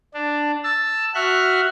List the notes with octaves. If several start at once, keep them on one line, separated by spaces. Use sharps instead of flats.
D4
A5 E6
F#4 E5 F6 F#6